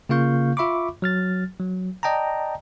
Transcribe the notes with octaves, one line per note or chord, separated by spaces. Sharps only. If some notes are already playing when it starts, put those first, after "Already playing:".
C#3 A#3 F4 F5 C#6 G6
F4 E5 B5 C#6 D6
F#3 F6 A6
F#3
D5 D#5 G5 A5 A#5